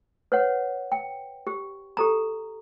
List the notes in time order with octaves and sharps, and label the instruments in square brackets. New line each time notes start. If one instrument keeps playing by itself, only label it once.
[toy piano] B4 C#5 F#5
G5
G4
G4 A4 A#5